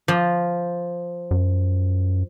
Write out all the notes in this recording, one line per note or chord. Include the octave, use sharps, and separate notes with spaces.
F3
F#2